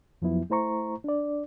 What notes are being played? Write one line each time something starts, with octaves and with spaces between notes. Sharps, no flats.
F2 F3 F#3 B3 E4
A3 E4 C5 A#5 C#6
D4 D5